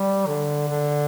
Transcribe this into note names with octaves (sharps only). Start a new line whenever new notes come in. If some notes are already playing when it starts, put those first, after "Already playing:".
Already playing: G3
D3
D3